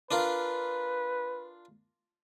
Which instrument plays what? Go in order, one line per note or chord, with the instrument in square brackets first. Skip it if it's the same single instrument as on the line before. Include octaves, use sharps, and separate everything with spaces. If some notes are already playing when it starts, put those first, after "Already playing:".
[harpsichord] D4 F4 A#4 [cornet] B4